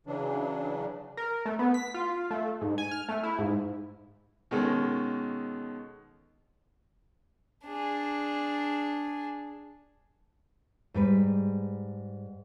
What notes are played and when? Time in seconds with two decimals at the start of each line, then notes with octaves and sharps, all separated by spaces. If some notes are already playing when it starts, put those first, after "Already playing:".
0.07 C#3 E3 F#3 D4
1.17 A#4
1.45 A3
1.59 B3
1.74 B6
1.94 F4
2.31 A3
2.61 G#2
2.78 G#5
2.91 F6
3.08 A3
3.23 E4
3.39 G#2
4.51 B2 D#3 G#3 C#4 A4
7.67 D4 G#4
10.94 G#2 G3 B4